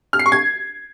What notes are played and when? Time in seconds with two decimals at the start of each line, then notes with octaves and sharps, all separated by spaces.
0.13 F6
0.19 C7
0.26 C#6
0.32 G#6